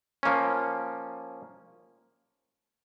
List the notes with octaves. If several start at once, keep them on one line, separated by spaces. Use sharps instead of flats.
F3 A#3 C#4